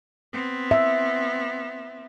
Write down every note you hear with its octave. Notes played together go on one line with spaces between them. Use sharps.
B3 C4
E5